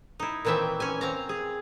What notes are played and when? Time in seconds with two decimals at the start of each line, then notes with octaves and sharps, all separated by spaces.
0.20 D#4 E4
0.45 A#2 D#3 E3 C4 E5 G5
0.80 C#4 G#5
1.01 C4 F5 A#5
1.29 G#4